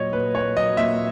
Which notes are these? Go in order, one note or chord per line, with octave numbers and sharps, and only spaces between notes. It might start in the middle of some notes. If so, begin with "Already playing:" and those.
Already playing: A#2 F#3 C#5 D#5
A#2 B4
A#2 C#5
F#3 D#5
A#2 E5